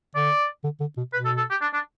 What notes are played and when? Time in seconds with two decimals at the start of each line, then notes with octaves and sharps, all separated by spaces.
0.15 D3 D5
0.64 D3
0.80 D3
0.97 B2
1.13 B2 B4
1.25 A4
1.37 A4
1.50 G4
1.61 D4
1.74 D4